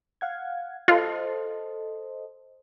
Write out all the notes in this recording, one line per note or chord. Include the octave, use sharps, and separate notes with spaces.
F5 F#5 G#6
F4 A4 C5 D#5